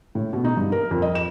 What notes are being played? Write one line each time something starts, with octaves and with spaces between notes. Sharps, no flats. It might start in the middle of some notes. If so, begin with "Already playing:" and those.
A2
B2
D#4
G2
A#4
F2
D#5
E7